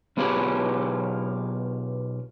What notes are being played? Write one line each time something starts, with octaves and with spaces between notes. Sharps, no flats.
B1 B3 F4 G4 G#4 B5